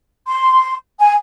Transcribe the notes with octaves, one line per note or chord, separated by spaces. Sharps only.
C6
G#5